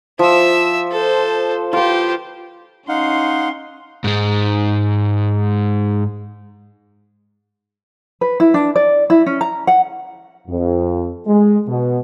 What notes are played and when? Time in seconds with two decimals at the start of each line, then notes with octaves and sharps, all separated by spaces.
0.19 F3 E5 E6
0.91 A4 C5
1.73 F4 G4 B4 C5
2.89 C#4 D#4 F5 F#5 C6
4.04 G#2 G#3
8.21 B4
8.40 E4
8.54 D4
8.76 D5
9.10 E4
9.26 C#4
9.41 A#5
9.67 F#5
10.48 F2
11.27 G#3
11.67 B2